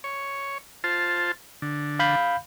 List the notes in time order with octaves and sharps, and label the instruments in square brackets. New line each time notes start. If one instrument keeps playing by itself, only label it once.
[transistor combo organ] C#5
F4 C5 A5
D3
[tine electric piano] F5 B5 G6